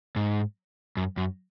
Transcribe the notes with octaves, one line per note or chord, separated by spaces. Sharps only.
G#2
F#2
F#2